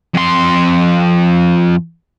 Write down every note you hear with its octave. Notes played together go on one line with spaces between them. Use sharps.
F2 C6